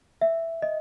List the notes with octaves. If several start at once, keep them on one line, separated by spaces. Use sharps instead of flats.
E5
D#5